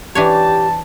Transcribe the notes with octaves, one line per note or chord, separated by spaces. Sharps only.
E3 D4 G4 C#5 A5